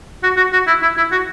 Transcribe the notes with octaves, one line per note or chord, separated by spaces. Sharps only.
F#4
F#4
F#4
E4
E4
E4
F#4